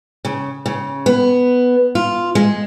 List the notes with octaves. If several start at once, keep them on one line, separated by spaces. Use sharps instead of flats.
C#3
C#3
B3
F4
G#3